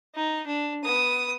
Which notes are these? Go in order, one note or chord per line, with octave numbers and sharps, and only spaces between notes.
D#4
D4
B3 D#6